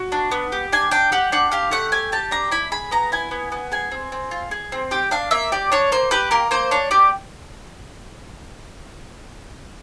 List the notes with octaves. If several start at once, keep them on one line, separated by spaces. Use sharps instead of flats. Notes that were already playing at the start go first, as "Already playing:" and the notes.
Already playing: F#4
D4
B3
G4
D4 G#5
D4 G5
G4 F#5
D4 F#5
G4 F5
A3 F#5
G4 G#5
G4 A5
D4 A#5
E4 B5
G#4 B5
B3 A#5
E4 G#5
B3
B3
G#4 G#5
C4
C4
F4
G#4
C4
G4 G5
D4 F5
A#3 E5
G4 D5
D4 C#5
A#3 C5
G4 B4
A#3 A#4
A#3 C5
D4 C#5
G4 D5